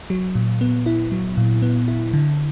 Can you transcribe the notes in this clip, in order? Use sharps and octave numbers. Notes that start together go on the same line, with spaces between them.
F#3
A#2
B3
E4
F#3
A#2
B3
E4
D3